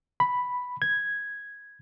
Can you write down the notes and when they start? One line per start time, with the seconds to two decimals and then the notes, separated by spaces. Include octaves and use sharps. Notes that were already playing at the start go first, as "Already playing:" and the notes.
0.20 B5
0.82 G#6